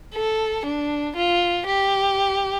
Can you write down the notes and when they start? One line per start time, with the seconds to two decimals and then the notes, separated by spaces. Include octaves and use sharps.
0.15 A4
0.65 D4
1.16 F4
1.67 G4